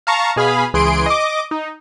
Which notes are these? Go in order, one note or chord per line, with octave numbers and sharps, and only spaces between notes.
F5 A5 A#5 C#6
B2 G#4 F5 B5
C#2 E3 G#4 C6 D7
D#5 D6
D#4